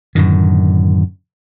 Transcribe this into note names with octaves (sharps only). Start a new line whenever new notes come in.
F#2 A2 D3 D#3